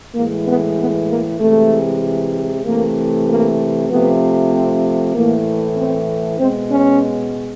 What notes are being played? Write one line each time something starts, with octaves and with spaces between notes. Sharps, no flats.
A2 E3 G#3 A#3
B3
B3
A#3
C3 E3 G#3 A3
C3 E3 A3 A#3
A#3
C3 F3 A3 B3
C4
A2 E3 A3 A#3
C4
B2 G#3 C4
C#4